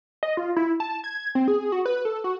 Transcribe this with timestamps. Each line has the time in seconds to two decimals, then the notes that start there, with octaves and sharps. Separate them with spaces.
0.23 D#5
0.37 F4
0.56 E4
0.80 A5
1.04 G#6
1.35 C4
1.48 G#4
1.72 F#4
1.86 B4
2.05 A4
2.24 F#4